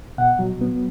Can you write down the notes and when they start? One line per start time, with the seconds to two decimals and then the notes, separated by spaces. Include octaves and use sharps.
0.18 B2 F#5
0.39 F#3
0.61 B3